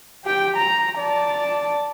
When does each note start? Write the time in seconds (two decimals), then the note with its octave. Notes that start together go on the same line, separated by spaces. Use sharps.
0.25 G4 G5
0.56 A#5
0.99 D5 A5